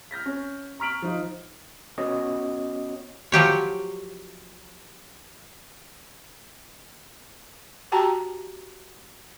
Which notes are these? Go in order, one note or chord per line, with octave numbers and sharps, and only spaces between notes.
F6 G6 A#6 B6
C#4
A#5 C#6 F6 B6 D7 F#7
F3 D#4 F4
B3 C#4 F#4 C#5 D#5
F3 F#3 G4 C#5
F#4 G4 G5 A5 A#5